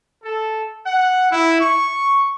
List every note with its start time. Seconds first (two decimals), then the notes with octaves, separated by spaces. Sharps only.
0.23 A4
0.86 F#5
1.31 E4
1.60 C#6